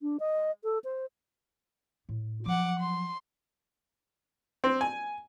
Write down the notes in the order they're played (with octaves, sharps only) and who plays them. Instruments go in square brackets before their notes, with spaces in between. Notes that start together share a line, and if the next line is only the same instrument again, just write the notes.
[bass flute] D4
D#5
A4
C5
[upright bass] A2
[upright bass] F3 F#3 [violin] F#5 D6
[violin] C6
[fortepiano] C4
G#5